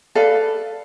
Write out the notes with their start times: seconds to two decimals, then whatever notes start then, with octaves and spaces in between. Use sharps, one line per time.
0.15 A4 B4 D5 F5